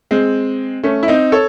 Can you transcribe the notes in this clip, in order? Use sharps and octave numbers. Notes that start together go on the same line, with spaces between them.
G#3 C4
A3 C#4
E4
C4 D#4
A4 C#5